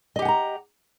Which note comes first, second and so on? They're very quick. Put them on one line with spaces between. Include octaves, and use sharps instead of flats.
D#5 G4 F#5 G#5 A#5